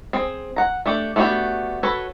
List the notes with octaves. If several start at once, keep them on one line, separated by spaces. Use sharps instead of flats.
C4 G#4
F#5 A#5
A3 D4 G4
A3 B3 D4 F#4 G4
F#4 A4 B4 C#5